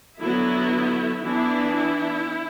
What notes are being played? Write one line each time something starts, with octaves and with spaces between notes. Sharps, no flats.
D3 F#3 B3 E4
E3 B3 D4 E4
E4